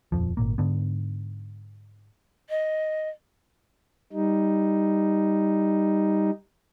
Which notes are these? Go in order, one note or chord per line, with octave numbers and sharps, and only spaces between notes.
D#1 A#1 F2 F3
G#1 A#2 A#3
G#2 D3 B3
D#5
G3 D#4